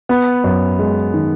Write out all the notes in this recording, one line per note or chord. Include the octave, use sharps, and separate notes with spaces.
B3
F#2
G#3
D#3